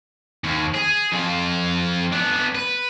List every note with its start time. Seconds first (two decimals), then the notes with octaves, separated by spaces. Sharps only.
0.44 D#2
0.75 G#4
1.12 F2 F4
2.12 B3 D4
2.55 B4